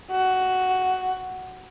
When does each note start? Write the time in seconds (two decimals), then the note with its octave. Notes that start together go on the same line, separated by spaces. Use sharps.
0.12 F#4